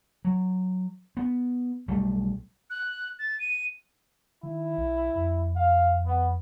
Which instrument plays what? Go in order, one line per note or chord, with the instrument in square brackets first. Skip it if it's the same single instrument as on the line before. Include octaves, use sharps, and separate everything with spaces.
[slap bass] F#3
B3
B1 G3 A3
[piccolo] F#6
A6
D#7
[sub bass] D#3 [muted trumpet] E4
[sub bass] B1
F2
[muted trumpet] F5
B3